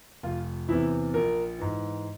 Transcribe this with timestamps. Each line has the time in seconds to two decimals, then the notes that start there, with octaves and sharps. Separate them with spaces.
0.23 F1 F4
0.68 E2 C3 E3 E4
1.14 A#1 A#4
1.58 G#2 E3